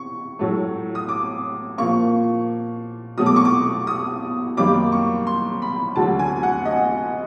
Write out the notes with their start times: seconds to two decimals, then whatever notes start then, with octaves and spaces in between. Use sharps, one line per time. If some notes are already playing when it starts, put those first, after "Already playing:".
Already playing: C#6
0.39 A2 F#3 A3
0.95 D#6
1.09 D6
1.78 A#2 F3 A#3 C#6
3.17 B2 F#3 A3 D#6
3.26 D6
3.36 C#6
3.45 D6
3.87 D#6
4.57 F#2 D#3 G3 A#3 D6
4.92 C#6
5.27 C6
5.62 B5
5.96 D2 D3 F#3 A5
6.19 G#5
6.43 F#5
6.65 D#5